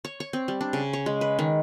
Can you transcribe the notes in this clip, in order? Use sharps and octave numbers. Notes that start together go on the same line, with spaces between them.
C#5
C#5
C4
G3
D4
C#3
C#5
G#3
B4
D#3